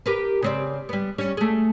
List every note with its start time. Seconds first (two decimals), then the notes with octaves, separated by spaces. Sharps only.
0.06 G4 A#4 B4
0.42 C#3 C4 D5
0.89 G3 B3
1.18 G3 C#4 C#5
1.37 A3 G#4